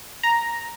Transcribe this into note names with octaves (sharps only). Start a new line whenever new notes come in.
A#5